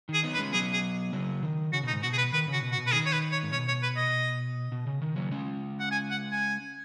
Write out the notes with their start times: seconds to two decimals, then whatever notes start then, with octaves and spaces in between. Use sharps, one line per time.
0.09 D#3 G#4
0.23 B3 D#4
0.34 B4
0.38 G#3 C#4
0.53 F#3 B3 G#4
0.73 G#4
1.13 C#3 F#3
1.43 D#3
1.73 C#3 F#4
1.83 B2 D#4
1.93 G#2
2.03 B2 F#4
2.13 G#4
2.18 B4
2.33 D#3 B4
2.48 C#3
2.53 F#4
2.62 B2
2.72 F#4
2.78 B2
2.87 B4
2.92 D#3 G#4
3.06 C#5
3.12 B4
3.32 C#5
3.43 G#2
3.52 B2 C#5
3.68 C#5
3.83 B4
3.97 D#5
4.72 B2
4.87 C#3
5.02 D#3
5.16 C#3 F#3
5.31 G#3 C#4
5.80 F#5
5.91 G#5
6.11 F#5
6.32 G#5